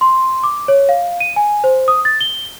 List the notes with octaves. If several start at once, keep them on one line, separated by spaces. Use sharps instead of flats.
C6
D6
C#5
F5
D#7
G#5
C5
D#6
A6
G7